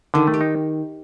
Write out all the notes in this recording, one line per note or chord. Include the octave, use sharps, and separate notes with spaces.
D3 D#3
A3
G4
D#4